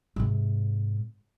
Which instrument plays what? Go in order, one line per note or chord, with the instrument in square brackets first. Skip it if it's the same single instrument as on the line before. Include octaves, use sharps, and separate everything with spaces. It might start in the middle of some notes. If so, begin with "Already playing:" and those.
[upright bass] G#2 C3